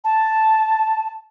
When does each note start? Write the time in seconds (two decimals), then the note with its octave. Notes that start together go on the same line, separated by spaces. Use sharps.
0.04 A5